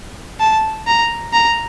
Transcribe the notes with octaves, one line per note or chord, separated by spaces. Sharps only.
A5
A#5
A#5